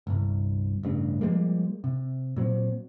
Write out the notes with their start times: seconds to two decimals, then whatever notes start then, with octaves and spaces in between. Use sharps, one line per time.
0.07 G1 C2
0.83 A1 G2 C#3
1.21 F3 G3 G#3 A#3
1.84 C3
2.36 A#2 F#3 C4